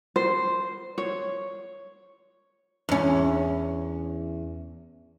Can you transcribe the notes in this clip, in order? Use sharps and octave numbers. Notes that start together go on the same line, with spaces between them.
C5
C#5
E2 C#4